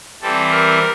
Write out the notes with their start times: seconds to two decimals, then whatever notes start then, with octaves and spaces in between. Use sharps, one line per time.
0.21 E3 G3 C4 A4
0.50 A#4